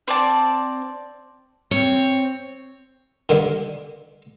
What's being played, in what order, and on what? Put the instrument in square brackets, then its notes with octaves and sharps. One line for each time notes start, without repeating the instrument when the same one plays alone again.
[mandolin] C4 D5 A5
[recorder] C4 [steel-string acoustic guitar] C#5
[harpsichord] G2 D3 D#3